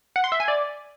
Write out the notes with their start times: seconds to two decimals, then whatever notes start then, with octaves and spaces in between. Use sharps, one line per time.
0.16 F#5
0.24 C6
0.32 E5
0.40 G#5
0.48 D5